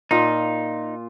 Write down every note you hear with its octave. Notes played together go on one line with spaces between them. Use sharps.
A#2 D#4 F4